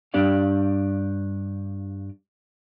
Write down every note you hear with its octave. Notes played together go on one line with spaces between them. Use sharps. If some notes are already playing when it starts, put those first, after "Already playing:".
G2 D4 G4 D5 F5